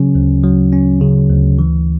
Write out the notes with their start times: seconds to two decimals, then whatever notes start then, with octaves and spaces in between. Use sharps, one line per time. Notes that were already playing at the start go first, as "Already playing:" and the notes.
Already playing: C#3 F#3 C#4
0.15 D2
0.43 F#3
0.72 C#4
1.01 C#3
1.30 D2
1.59 E3